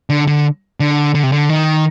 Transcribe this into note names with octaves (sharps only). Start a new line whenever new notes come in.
D3
D3
D3
D3
C3
D3
D#3